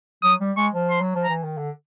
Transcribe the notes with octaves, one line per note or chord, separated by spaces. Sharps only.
F#3 D#6
G3
G#3 C#6
F3
C6
F#3
F3
A#5
E3
D#3
D3